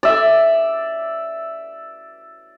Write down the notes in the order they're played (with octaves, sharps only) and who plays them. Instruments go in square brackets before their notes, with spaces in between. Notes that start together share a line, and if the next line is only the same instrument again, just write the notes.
[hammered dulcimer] D5 E5